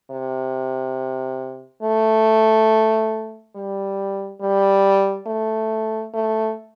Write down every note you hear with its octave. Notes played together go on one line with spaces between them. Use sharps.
C3
A3
G3
G3
A3
A3